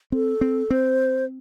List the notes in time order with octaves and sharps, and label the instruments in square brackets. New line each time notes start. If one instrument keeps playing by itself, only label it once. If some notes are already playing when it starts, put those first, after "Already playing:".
[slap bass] C4 [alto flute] A4
[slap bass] C4
[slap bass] C4 [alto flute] C5